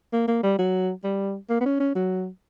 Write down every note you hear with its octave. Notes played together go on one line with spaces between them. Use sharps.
A#3
A#3
G3
F#3
G3
A#3
B3
C#4
C#4
F#3